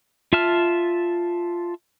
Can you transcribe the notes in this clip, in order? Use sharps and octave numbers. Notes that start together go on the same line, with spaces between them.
F4 E5 A5 F6